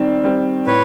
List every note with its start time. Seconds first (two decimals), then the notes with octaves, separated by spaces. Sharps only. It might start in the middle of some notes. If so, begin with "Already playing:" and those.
Already playing: D#3 G3 C4
0.24 G3 C4
0.66 A2 B4 C#5